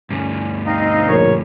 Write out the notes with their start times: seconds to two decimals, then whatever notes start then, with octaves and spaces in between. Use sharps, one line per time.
0.11 D2 G2 C#4
0.66 C4 D#4 D#5 F5
1.09 A#1 A#4 C#5